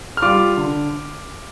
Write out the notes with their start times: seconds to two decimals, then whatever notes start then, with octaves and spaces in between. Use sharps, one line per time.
0.17 F6
0.22 G3 F4 D6
0.57 D3